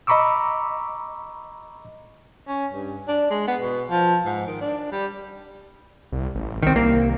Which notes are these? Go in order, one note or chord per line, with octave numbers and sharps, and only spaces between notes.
D#5 A#5 B5 C#6 D6 E6
C#4
G2
D4
G#3
B3
B2
F3
G#2
D#3
D4
G3
C2
A1
C2 D#3 C4
A#3